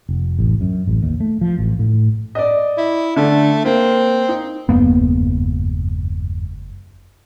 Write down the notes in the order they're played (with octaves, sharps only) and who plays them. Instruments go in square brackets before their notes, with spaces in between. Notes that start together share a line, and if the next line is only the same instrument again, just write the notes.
[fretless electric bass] F1
A1
F#2
A1
D#2
A3
F3
A1
A2
[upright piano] D5 D#5
[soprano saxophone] E4
[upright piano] D3 [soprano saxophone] A3
[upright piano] A#3 [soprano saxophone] C4
[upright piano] D#4
[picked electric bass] F#1 A#3 B3 [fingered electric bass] E2 G2 G#3